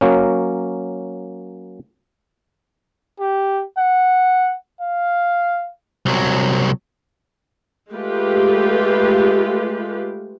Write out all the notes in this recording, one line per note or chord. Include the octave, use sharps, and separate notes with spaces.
F#3 A#3 C#4
G4
F#5
F5
C2 F#3
G#3 A3 F4 G4 B4